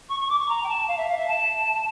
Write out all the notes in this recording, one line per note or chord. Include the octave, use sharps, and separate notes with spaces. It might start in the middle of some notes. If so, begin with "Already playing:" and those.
C#6
C#6
D6
C#6
A#5
G5
A5
F5
E5
F5
E5
A5